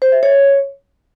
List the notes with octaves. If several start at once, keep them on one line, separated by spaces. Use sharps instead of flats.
C5
E5
C#5